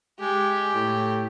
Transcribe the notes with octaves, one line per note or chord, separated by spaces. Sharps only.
G#3 G4
A2